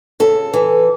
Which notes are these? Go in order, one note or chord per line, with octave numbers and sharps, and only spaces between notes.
C#3 A4
E3